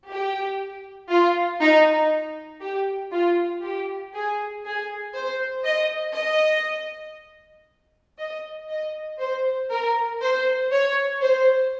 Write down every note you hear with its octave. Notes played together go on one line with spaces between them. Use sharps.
G4
F4
D#4
G4
F4
G4
G#4
G#4
C5
D#5
D#5
D#5
D#5
C5
A#4
C5
C#5
C5